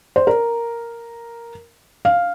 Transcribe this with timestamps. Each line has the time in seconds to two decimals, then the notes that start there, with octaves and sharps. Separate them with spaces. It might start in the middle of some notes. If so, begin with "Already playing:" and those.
0.16 C5
0.27 A#4
2.05 F5